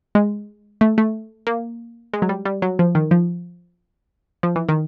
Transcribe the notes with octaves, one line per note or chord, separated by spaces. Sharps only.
G#3
A3
A3
A#3
G#3
F#3
G3
G3
F#3
F3
D#3
F3
F3
E3
D#3